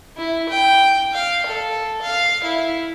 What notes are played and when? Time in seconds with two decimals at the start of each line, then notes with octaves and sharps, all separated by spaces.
0.17 E4
0.49 G5
1.13 F5
1.46 A4
2.02 F5
2.44 E4